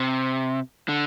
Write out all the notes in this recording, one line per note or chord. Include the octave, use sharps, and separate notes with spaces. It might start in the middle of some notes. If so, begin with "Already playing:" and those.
Already playing: C3
D3